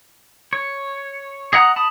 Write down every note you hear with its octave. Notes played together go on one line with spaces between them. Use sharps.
C#5
G#4 D#5 F#5 A#5 D#6
A5 B5 D#6